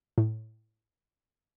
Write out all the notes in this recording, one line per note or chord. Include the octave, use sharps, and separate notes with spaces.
A2